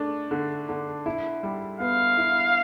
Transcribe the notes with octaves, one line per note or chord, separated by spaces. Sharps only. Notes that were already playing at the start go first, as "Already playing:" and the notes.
Already playing: A3 D4
D3
D3
E4
G3
B3 F5
E4